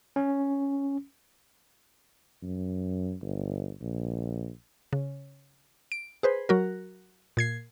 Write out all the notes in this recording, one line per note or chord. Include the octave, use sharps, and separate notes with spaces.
C#4
F#2
G1
A#1
C#3
D7
G#4 B4 C5
F#3 F#4 A#4
A#2 G#6 C7